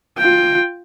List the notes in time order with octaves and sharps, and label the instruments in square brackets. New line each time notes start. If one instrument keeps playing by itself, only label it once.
[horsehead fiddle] F4 G5